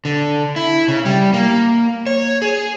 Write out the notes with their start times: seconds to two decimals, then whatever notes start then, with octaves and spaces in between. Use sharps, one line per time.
0.05 D3
0.56 E4
0.88 C#3
1.05 G3
1.33 A#3
2.07 C#5
2.42 G#4